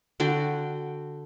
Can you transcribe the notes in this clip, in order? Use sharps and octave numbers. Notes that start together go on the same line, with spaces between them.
D3 F#4 G5